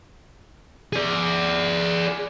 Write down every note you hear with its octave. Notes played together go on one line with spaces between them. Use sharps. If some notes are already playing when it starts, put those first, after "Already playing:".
G#4 D5